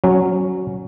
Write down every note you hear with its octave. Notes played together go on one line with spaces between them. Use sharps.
F#3 C#4